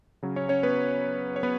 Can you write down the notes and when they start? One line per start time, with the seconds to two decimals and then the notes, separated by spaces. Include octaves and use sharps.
0.23 C#3 F#3 C#4
0.36 C#4 C#5
0.49 C#4 C#5
0.63 B3 B4
1.36 C#5
1.43 B3 B4